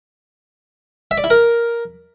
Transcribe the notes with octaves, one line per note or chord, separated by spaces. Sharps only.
E5
D5
E4
A#4